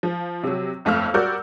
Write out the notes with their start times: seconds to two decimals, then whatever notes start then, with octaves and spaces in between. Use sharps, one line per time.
0.03 F3
0.43 C3 F#3
0.85 G1 F2 A3 F5 E6 F6
1.14 G3 F#4 A#4 D5 E6 G6